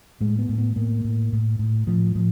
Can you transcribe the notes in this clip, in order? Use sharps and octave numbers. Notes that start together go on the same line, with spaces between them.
A2 G#3
B3
A2
B3
A2 A#3
A2
A2
A2
A2 F3
A2 F3